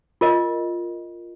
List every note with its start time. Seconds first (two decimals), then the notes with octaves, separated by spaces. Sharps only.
0.21 F4 A#4 D#5